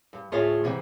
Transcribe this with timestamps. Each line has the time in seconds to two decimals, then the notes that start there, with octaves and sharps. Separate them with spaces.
0.13 G2
0.32 D2 A2 F4 G#4 C#5 E5
0.64 G#2 C3 E3